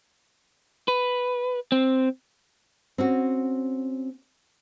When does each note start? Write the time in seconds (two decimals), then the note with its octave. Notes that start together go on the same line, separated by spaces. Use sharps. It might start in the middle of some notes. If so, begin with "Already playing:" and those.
0.88 B4
1.72 C4
2.98 C4 C#4 F#4